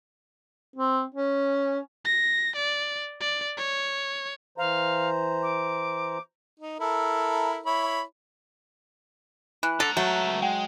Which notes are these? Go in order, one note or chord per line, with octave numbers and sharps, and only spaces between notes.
C4
C#4
A#6
D5
D5
C#5
E3 C5 F5 A#5
D6
D#4
E4 A4 A#4
E4 C#5 B5
E3 F#6
C#2 D3 A4 A#5
F#3 A3
G#3 F#5 G5